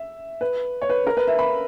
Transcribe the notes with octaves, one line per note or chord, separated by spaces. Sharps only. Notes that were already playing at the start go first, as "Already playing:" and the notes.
Already playing: E5
B4
C#5
B4
A#4
B4
E5
B5